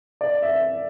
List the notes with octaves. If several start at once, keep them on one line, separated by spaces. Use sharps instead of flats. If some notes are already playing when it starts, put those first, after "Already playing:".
D5
E5